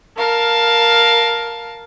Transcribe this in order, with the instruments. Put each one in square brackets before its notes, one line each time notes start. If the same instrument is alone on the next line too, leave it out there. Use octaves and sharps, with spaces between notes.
[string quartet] A#4 F5 A5